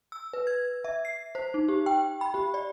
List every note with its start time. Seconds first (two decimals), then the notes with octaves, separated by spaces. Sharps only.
0.12 E6
0.33 B4
0.47 G#6
0.84 E5
1.05 C7
1.35 C5
1.54 D#4
1.68 G4
1.86 G5
2.21 B5
2.34 G4
2.54 D5